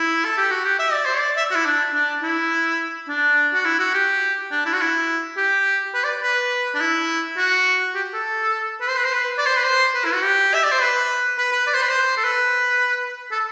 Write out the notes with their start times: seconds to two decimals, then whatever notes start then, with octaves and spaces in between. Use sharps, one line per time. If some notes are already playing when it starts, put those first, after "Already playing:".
Already playing: E4
0.25 A4
0.38 G4
0.51 F#4
0.65 G4
0.79 E5
0.93 D5
1.06 C5
1.19 D5
1.37 E5
1.51 F#4
1.56 E4
1.66 D4
1.94 D4
2.23 E4
3.08 D4
3.54 F#4
3.65 E4
3.80 F#4
3.94 G4
4.52 D4
4.66 E4
4.74 F#4
4.82 E4
5.37 G4
5.94 B4
6.04 D5
6.23 B4
6.75 D4
6.81 E4
7.38 F#4
7.95 G4
8.14 A4
8.81 B4
8.89 C5
8.97 B4
9.05 C5
9.13 B4
9.38 D5
9.46 C5
9.56 B4
9.64 C5
9.95 B4
10.05 E4
10.14 F#4
10.24 G4
10.55 E5
10.64 D5
10.72 C5
10.81 B4
11.38 B4
11.52 B4
11.67 D5
11.74 C5
11.82 B4
11.89 C5
12.18 A4
12.24 B4
13.32 A4